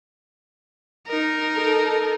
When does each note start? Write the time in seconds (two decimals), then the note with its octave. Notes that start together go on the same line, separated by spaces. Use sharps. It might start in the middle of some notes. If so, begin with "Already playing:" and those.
1.07 D#4 A#4
1.56 A4